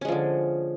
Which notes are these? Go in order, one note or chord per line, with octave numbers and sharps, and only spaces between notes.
D3 F3 G#3 C#4